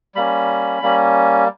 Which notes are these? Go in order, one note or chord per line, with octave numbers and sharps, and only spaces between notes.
G3 A#3 C#4 B5
G3 A#3 C#4